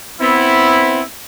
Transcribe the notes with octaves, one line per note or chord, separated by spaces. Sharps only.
B3 C4 E4